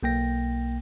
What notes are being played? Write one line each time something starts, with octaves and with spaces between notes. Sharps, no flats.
B1 A#3 G5 A#6